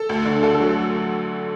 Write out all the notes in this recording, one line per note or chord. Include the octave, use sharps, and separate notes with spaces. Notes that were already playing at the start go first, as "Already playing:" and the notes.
Already playing: A4
D2
D3
D3 A4
A4
F#3